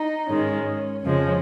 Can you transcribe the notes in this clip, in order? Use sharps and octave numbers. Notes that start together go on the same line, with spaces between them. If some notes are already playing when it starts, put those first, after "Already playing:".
Already playing: D#4
G#2 D#3 G#3 C#4
F2 C#3 F3 G#3 C#4